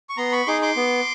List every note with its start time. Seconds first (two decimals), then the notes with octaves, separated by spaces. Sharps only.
0.09 C#6
0.17 B3 A#5 C6
0.32 B5 C#6
0.46 D#4 G#4 C6 D6
0.62 C6 D6
0.76 B3